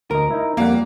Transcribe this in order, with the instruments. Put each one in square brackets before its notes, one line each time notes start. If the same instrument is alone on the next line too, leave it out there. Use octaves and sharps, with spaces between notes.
[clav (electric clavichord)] D2 D#5 [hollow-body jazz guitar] A#4
[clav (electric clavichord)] D#4 E4
[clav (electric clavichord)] F2 G3 F#5 [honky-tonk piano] A#3